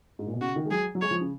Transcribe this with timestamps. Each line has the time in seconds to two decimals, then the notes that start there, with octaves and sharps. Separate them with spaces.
0.19 G#2
0.26 A#2
0.33 B2
0.41 C#3 F#4
0.56 D#3
0.66 G#3
0.71 F#3 G#4
0.95 F#3
1.02 G#3 C#5
1.11 F3
1.21 C#3